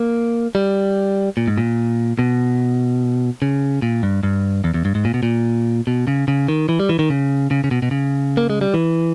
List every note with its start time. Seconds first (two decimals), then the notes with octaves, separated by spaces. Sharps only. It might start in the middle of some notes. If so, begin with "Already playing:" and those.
Already playing: A#3
0.55 G3
1.37 A#2
1.48 G#2
1.58 A#2
2.19 B2
3.42 C#3
3.82 A#2
4.03 G2
4.23 G2
4.64 E2
4.74 E2
4.85 G2
4.95 G#2
5.05 A#2
5.14 B2
5.23 A#2
5.87 B2
6.08 C#3
6.28 C#3
6.48 D#3
6.69 E3
6.80 G3
6.89 E3
6.99 D#3
7.10 C#3
7.51 C#3
7.64 C#3
7.71 B2
7.82 B2
7.91 C#3
8.37 A#3
8.50 G#3
8.61 G3
8.74 E3